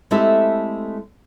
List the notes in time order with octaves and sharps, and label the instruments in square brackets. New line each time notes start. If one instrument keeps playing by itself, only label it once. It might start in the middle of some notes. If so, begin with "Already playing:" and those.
[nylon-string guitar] G#3 A3 C4 E4 G4 A4